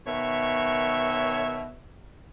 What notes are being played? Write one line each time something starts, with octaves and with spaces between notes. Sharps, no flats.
B2 D#3 C#5 E5